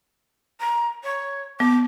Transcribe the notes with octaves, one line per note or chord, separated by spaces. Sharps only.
A#5
C#5
B3 D6